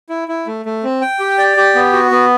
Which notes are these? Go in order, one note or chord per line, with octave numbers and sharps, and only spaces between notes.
E4
E4
A3
A3
C4
G5
G4
D5
G4
B3
F#4
B3